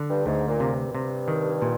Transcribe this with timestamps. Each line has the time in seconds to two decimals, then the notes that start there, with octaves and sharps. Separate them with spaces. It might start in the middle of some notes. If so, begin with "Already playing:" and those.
Already playing: D3
0.09 G2
0.25 D2 G#2
0.48 A#2
0.60 C3
0.72 G2
0.95 C3
1.28 D#3
1.62 A#2